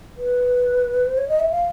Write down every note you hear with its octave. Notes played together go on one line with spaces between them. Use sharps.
B4
C5
C#5
D#5
E5
F5